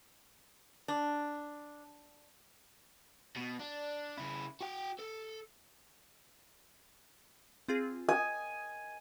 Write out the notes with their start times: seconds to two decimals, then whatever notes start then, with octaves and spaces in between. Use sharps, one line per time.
0.88 D4
3.36 B2
3.60 D4
4.17 C#3 E4
4.61 F#4 G5
4.99 A4
7.68 C4 F4 G#4
8.09 G#5 D#6